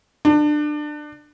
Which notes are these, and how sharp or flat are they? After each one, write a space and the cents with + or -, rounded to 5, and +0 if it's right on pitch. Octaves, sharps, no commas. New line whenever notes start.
D4 +25